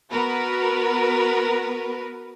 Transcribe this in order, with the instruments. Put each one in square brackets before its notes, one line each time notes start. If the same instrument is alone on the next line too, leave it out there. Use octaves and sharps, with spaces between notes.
[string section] B3 F#4 A#4 B4